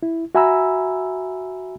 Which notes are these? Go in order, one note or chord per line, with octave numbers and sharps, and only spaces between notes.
E4
F#4 E5 G#5 A#5 B5 E6